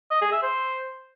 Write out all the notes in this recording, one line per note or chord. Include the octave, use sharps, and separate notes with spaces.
D#5
G#4
E5
C5